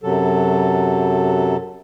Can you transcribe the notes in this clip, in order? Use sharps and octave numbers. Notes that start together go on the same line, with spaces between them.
F#2 C3 F#3 A4